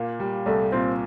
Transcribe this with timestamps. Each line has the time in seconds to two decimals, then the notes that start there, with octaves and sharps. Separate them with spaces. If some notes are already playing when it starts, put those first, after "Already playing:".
Already playing: A#2 A#3
0.20 G3
0.46 C2 A3
0.72 A#2 C4